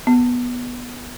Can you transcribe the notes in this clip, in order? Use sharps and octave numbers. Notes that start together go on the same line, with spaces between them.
B3